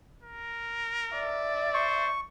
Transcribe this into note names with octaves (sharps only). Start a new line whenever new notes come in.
A#4
D5 E5
C5 C#6